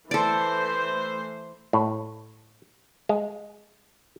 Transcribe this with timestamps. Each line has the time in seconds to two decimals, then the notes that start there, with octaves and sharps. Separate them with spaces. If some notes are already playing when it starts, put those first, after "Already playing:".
0.11 E3 A3 A4 C5 D5
1.73 A2
3.09 G#3